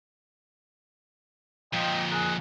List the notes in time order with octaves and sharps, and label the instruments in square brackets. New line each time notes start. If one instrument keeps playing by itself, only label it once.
[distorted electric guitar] F2 A#2 [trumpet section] D#5 G5
[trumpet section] G#4 A#4 F#5